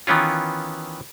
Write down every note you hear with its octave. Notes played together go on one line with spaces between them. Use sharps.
D#3 E3 B3 C#4 F4